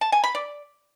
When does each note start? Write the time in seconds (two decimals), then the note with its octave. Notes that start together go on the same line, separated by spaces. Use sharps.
0.01 A5
0.12 G#5
0.24 B5
0.35 D5